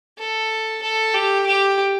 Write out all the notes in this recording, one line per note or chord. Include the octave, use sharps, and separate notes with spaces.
A4
A4
G4
G4